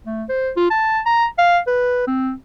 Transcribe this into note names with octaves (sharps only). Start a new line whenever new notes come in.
A3
C5
F4
A5
A#5
F5
B4
C4